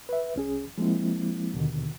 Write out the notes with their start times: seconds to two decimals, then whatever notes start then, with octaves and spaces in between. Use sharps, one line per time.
0.09 B4 E5
0.36 C2 C#4 G#4
0.78 F3 G#3 A#3 C4 E4
1.54 D#2 B2 D3 D#3